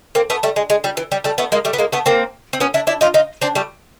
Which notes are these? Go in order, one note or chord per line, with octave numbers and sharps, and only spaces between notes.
A#3 C4
A3 B3
G3 A3
G#3
G#3
G3
E3
G3
G3 A3
A3 B3
G#3 A#3
G3 A3
B3
G#3 A#3
A3 B3
A#3 C4
C4
B3 C#4
D4 E4
D4 E4
D#4 F4
D#4 F4
C4 D4
G3 A3